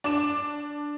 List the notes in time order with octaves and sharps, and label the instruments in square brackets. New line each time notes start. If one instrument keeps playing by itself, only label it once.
[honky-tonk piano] D4 D6 E7